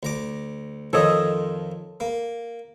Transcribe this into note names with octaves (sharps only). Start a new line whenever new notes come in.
D2 A#5 D6
F2 D#3 F3 A4 C#5 D#5
A#3